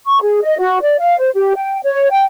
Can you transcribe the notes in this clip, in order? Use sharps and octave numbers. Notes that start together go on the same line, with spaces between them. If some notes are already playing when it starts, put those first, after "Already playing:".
C#6
G#4
D#5
F#4
D5
F5
C5
G4
G5
C#5
G5